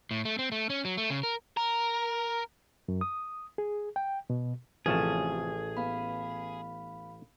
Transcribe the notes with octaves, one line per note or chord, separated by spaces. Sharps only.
A2
A3
C4
A3
C#4
F#3
A3
C#3
A#4
A#4
F#2
D#6
G#4
G5
B2
A1 C3 F3 C#4 G#4 A4 A5
B3 F5 B5